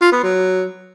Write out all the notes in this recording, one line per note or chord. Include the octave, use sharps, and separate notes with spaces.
F4
B3
F#3